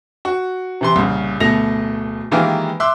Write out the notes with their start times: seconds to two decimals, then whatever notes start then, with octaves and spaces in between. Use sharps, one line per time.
0.25 F#4
0.81 C3 E3 C6
0.96 C2 A#2 C#3
1.40 D1 B2 A3 A#6 F7
2.31 D#3 E3 G#3 A#3 F4 G4
2.80 E5 C6 D6 E6 F#6